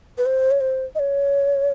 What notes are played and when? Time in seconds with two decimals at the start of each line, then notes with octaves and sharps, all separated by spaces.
0.18 B4
0.26 C5
0.51 C#5
0.61 C5
0.95 D#5
0.99 C#5